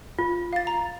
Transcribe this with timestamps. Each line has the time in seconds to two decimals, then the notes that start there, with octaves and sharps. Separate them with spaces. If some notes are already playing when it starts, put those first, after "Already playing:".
0.19 F4
0.53 F5 A6
0.67 A#5